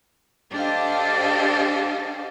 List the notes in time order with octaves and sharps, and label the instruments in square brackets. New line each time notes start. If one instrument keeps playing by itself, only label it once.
[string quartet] D4 G4 A4 C5 D#5 F5